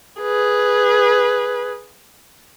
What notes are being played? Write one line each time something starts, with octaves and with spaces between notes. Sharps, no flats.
G#4 B4